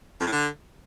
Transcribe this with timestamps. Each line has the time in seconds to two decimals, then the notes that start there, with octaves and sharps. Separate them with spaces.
0.21 F2
0.27 A2
0.33 D3